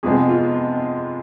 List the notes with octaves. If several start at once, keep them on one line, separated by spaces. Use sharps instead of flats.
F2 C3 G#3 B3 G#4
F4